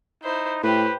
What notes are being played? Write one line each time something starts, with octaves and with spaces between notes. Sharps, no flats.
D#4 E4 C5
A2 G4 B4 C5